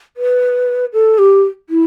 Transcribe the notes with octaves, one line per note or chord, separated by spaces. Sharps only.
B4
A4
G4
E4